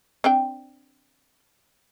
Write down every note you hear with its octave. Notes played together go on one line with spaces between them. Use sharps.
C4 D4 G5